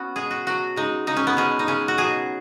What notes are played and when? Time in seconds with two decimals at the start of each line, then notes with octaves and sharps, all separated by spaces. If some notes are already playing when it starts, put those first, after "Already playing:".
Already playing: B3 C#4 F#4
0.16 B2 G#3 G#4
0.31 F#4
0.46 B2 F#3 F#4
0.76 C#3 G#3 D#4
1.07 C#3 G#3 D#4
1.17 C#4
1.27 B3
1.37 B2 G#3 C#4
1.59 D#4
1.67 C#3 G#3 C#4
1.88 F#4
1.98 B2 F#3 G#4